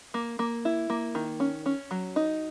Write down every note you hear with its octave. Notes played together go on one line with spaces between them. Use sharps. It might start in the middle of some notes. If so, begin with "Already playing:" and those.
A#3
A#3
E4
A#3
D#3
C#4
C#4
F#3
D#4